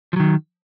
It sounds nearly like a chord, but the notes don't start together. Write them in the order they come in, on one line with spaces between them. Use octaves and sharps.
F3 F#3 D#3